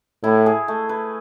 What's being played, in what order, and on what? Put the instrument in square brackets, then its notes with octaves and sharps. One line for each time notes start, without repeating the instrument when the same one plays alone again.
[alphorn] A2 [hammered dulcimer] E4
[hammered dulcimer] G#4
A3
B4